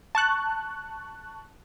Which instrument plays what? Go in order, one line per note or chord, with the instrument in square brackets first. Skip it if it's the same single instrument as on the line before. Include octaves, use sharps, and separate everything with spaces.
[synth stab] A5 C#6 F#6